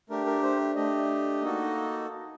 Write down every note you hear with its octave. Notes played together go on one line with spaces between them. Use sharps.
A3 D4 G4 A#4
A#4
C5
A3 D4 G4 D#5
A#3 D#4 F#4 A4